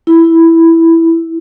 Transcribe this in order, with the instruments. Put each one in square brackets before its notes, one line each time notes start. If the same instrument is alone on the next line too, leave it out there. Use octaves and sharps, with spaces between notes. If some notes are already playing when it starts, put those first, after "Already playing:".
[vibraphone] E4